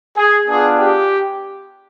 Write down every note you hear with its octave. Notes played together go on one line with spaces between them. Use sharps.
G#4
B3 D4 F4 G#4
G4